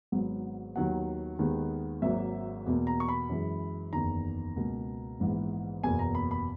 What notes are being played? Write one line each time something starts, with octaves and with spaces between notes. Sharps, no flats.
G#1 G#2 F#3 B3
D#2 D#3 F#3 B3 F#5
D#2 D#3 G#3 B3
G#1 G#2 F#3 A#3 E5
E2 B2 A#3
A#5
C#6
B5
F#2 E3 G#3
F#1 E2 D#3 A#5
C#2 B2 A#3
A#1 G#2 E3 B3
F#1 E2 B2 A#3 G#5
A#5
B5
B5